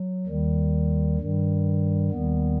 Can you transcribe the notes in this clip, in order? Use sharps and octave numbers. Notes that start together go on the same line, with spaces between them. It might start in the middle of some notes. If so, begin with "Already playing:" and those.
Already playing: F#3
D#2 D#3 G3
G2 D#3 G3
D#2 D#3 G3 B3